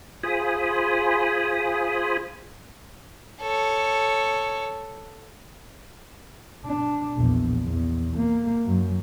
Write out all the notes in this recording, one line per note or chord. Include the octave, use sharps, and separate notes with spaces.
F4 G#4 C5 G#5 B5 D#6
A4 C#5
D4
A#1 E2
E2
A#3
F#2 F#3